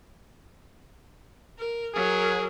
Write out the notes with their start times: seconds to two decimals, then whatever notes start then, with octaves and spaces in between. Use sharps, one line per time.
1.58 A#4
1.94 F#3 G#4 A#4